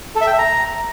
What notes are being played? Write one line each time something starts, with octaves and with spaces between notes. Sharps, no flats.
A4
E5
G5
E5
A#5